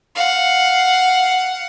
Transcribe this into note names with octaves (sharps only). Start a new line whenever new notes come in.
F5 F#5